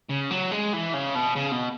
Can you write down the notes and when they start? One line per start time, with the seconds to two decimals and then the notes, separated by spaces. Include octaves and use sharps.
0.09 C#3
0.30 F#3
0.51 G#3
0.73 E3
0.94 C#3
1.15 B2
1.36 C#3
1.52 B2